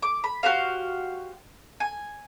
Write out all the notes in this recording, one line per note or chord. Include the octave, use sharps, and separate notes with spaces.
D6
B5
F#4 G4 C5 F5
G#5